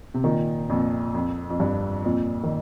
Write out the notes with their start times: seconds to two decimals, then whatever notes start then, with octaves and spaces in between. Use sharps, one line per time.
0.14 C3
0.24 A#2 D#3
0.70 F2 A#2
1.14 F2
1.50 F2
1.60 G2
2.05 F2 A#2
2.43 D#3